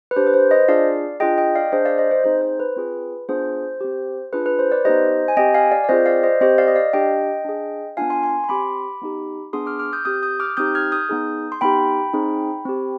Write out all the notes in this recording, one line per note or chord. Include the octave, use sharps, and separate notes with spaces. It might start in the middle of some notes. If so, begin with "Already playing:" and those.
B4
D4 G4 C5
B4
C5
C5 D#5
D4 F4 G#4 D5 F5
D4 F4 G#4 D#5 G5
D#5 G5
D5 F5
D4 G#4 C5 D#5
D5 F5
C5 D#5
C5
C4 D#4 G#4 C5
C5
B4
C4 F4 G#4
B3 D4 F4 G#4 C5
C4 G4
D4 F4 G#4 B4
B4
C5
B4 D5
B3 D#4 G4 C5 D#5
G#5
C4 G4 D#5 G5
F5 G#5
D5 F5
D5
C4 F4 G#4 C5 D#5
D5 F5
C5 D#5
C4 G4 C5 D#5
D5 F5
D#5
D5 F5
D4 G4 D#5 G5
D4 G#4
B3 D4 F4 F5 G#5
G#5 C6
G#5 C6
C6
C4 G4 B5 D6
B3 D#4 G4
B3 D4 G#4 C6 D#6
D6 F6
D6 F6
D#6 G6
C4 G4 D#6 G6
D#6 G6
D6 F6
C4 D#4 G4 D#6 G6
F6 G#6
D#6 G6
B3 D#4 G#4
C6
B3 D#4 G4 G5 B5
C4 D#4 G#4
C4 G4